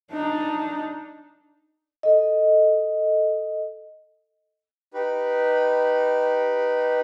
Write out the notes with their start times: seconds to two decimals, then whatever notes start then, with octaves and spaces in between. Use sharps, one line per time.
0.12 D4 D#4
2.03 A4 D#5
4.94 D#4 G4 B4